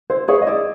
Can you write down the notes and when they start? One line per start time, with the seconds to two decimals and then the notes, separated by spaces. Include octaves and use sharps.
0.10 E4 C5
0.28 G#4 B4 C#5 E5
0.42 D#5
0.47 E4 D5